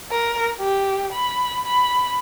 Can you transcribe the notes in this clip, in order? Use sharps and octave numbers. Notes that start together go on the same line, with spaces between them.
A#4
G4
B5
B5